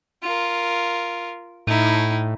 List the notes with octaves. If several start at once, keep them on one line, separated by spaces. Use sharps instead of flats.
F4 A#4
A2 D#4 E4